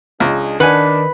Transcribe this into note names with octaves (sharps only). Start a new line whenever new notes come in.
C#2 G#3 D4 G#4
D#3 D4 B4 F#5 G#5